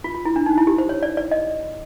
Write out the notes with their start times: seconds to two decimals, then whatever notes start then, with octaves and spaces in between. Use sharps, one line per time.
0.04 F4
0.15 F4
0.25 E4
0.36 D4
0.46 D#4
0.58 E4
0.67 G4
0.78 C5
0.89 C#5
1.03 D5
1.17 D5
1.31 D#5